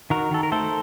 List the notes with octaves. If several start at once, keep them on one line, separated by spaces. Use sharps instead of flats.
D#3 F#4 A#4
D#3 A4
A#4
A3 A4 C5